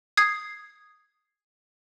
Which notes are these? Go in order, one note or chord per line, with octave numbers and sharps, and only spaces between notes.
D#6 G#6 C7